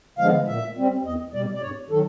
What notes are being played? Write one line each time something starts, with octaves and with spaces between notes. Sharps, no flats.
D3 F3 G#3 B3 F5
A#2 E5
G3 C4
E2 D#5
B2 G3 D5
D5
G2 C#5
D#3 F#3 A4